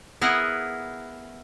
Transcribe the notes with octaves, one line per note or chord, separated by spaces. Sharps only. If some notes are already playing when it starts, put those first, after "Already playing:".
B3 E4 G#4 A#4 F#5